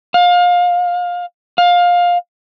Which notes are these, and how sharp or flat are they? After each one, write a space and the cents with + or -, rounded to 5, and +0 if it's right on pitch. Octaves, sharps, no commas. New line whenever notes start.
F5 +25
F5 +15